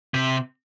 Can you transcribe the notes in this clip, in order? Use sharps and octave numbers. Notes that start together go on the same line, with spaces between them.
C3